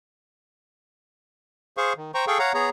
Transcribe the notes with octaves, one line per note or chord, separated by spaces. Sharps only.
G#4 C5 F5 C#6
D#3
C5 G5 A#5 C#6
G#4 A4 F5 G5 C#6
C#5 F5 F#5 A#5
B3 G#4 C#5 A#5